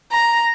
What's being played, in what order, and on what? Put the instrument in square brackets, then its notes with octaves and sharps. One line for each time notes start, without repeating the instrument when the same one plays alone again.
[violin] A#5